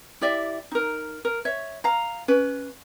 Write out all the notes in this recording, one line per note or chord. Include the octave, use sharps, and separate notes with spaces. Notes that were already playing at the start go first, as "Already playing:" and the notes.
E4 G4 D5 E5
D#4 A#4
A#4
C#5 E5
F5 A#5
C#4 B4